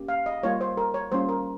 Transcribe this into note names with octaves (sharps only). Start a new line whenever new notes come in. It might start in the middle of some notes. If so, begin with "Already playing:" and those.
Already playing: A#3 C#4 G4
F5
D#5
G3 A#3 F4 C#5
C5
A#4
C#5
G3 A#3 C#4 F4 C5
A#4